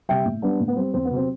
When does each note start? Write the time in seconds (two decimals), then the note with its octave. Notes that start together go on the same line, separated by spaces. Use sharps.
0.09 C3 G3 E5 G5
0.25 A2
0.42 G3 B3 D4
0.60 A2
0.68 B3
0.76 G3 C4
0.94 E2 C4
1.05 B3
1.11 C3 F#3
1.16 C4